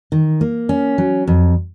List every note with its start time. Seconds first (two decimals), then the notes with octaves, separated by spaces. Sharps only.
0.12 D#3
0.41 A#3
0.69 C#4
0.98 F#3
1.27 F2